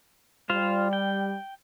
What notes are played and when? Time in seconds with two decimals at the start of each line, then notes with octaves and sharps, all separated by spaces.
0.50 G3 F4 C5 F5
0.93 G5